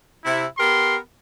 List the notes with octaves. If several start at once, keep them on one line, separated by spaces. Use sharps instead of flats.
C3 E4
B3 G4 A#4 C6